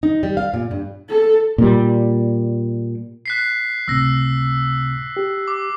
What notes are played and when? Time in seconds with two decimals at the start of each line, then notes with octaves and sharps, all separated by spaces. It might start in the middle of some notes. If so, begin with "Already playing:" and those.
0.03 D#4
0.23 G3
0.37 F5
0.54 A#2
0.71 G2
1.10 A4
1.58 A#2 G3
3.26 F#6 B6 C7
3.88 C#2 A2 C3 E6 A#6
5.17 G4
5.48 D6